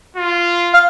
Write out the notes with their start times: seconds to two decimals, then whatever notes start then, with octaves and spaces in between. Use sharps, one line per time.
0.17 F4
0.74 F5